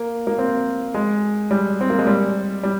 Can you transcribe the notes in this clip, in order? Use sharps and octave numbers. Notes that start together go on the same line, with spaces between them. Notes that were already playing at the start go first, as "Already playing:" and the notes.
Already playing: A#3
A#3
C4
G#3
G3
C4
A#3
G#3
G3
G3